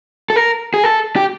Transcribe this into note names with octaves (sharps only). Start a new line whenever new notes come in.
A4
A#4
G#4
A4
G4